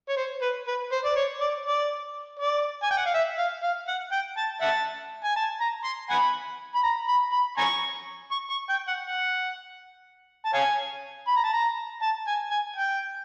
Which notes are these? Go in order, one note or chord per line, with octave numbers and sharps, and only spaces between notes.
C#5
C5
B4
B4
C5
D5
C#5
D5
D5
D5
G#5
G5
F#5
F5
E5
F5
F5
F#5
G5
A5
E5 F#5 A5
G#5
A5
A#5
C6
F#5 G#5 B5
B5
A#5
B5
B5
G#5 A#5 C#6
C#6
C#6
G5
F#5
F#5
A5
C#5 F5 G#5
B5
A#5
A5
A#5
A5
G#5
G#5
G5